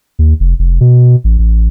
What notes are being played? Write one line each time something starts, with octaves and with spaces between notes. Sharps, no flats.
D#2
F1
F1
B2
A1
A1